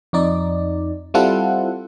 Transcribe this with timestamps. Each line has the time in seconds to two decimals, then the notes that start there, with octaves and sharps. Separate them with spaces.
0.13 F2 D#4 D5
1.14 G3 C4 E4 F4 A4 F#5